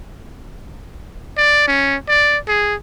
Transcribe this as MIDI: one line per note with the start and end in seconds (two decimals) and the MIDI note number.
1.38 1.64 74
1.68 1.96 61
2.09 2.37 74
2.48 2.75 68